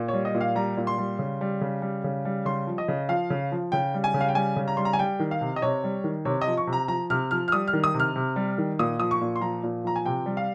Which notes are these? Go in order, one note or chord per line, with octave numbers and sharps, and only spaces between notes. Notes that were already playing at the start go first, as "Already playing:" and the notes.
Already playing: A#2
G3 C#5
D#5
A#2
F5
G3 A#5
A#2
C6
G3
C#3
G3
C#3
G3
C#3
G3
C#3 C6
F3
D#5
C#3
F3 F5
C#3
F3
C#3 G5
G3
G#5
C#3
F5
G5
G3 G#5
C#3
A#5
G3 C6
A#5
G#5
G3 G5
D#3
F5
C3
D#5
C3 C#5
G3
D#3
C3 C#5
D#5
F3
C#6
C3
A#5
F3 A#5
C3 F6
F3 F6
F6
G3 D#6
F6
D#3
D#6
C3
F6
C3
G3
D#3
A#2 D#6
F3 D#6
C#6
A#2
C6
F3 A#5
A#2
F3 A#5
G#5
C3 G5
G3
F5